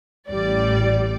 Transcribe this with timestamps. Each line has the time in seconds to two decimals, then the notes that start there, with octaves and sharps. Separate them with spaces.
0.29 A1 G3 D5